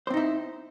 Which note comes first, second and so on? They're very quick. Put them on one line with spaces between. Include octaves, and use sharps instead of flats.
C5 C4 D#4 E4